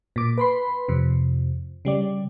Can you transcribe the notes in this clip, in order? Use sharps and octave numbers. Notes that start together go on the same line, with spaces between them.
A#2 D6
B4 B5 C6
F2 C3
C#3 G3 D5